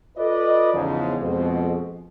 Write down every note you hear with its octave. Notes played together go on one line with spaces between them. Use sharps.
F4 A4 B4 D5 D#5
E2 G#2 C#3 F3
F2 B2 G#3 C4